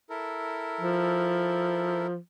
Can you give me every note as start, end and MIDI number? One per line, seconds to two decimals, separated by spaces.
0.10 2.07 64
0.10 2.07 69
0.10 2.07 70
0.81 2.17 53